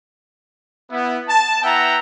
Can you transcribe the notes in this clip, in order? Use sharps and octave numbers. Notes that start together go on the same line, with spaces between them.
B3 E4
A5
B3 E4 E5 F#5 G5 A#5